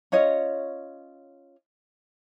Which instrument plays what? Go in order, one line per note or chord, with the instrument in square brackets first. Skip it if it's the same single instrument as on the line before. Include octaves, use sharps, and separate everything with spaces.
[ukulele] C#4 F4 C#5 D#5